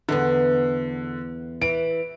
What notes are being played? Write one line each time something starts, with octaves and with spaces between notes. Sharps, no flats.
E2 D3 B3
E3 D7